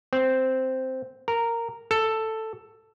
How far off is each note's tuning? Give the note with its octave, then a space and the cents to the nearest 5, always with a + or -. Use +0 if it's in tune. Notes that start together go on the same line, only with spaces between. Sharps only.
C4 -5
A#4 -10
A4 +5